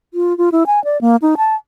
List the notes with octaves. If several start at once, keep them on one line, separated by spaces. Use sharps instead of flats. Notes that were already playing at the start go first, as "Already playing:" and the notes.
F4
F4
E4
G#5
D5
A#3
D#4
A5